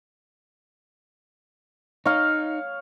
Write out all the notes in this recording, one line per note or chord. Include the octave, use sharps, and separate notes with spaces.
D#4 C#5 F5